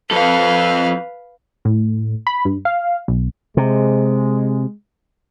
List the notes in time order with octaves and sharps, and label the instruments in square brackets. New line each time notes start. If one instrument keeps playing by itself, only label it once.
[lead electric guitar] F2 A4 [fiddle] B4 F5
[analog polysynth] A2
B5
G2
F5
B1
[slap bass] C3 [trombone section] G#3